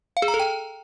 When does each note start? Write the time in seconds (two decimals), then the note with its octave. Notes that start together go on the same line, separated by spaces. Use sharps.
0.17 F5
0.22 G#4
0.28 A#5
0.34 A4
0.40 G5